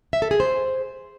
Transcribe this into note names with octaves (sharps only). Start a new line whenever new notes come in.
E5
A4
G#4
C5